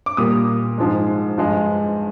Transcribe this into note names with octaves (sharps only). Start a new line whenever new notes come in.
D6
A#2 G3 A#3 D#6
G#2 F3 G#3
G2 F3 G#3